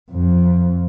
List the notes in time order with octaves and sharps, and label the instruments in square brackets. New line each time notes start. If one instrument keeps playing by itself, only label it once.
[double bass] F2